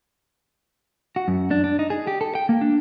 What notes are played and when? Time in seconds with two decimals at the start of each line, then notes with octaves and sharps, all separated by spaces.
1.16 F#4
1.28 F#2
1.51 D4
1.64 D4
1.79 D#4
1.90 G#4
2.07 G4
2.21 A4
2.35 G5
2.49 A#3
2.61 D4